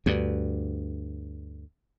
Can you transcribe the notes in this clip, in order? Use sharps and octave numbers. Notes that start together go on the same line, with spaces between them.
D2 G2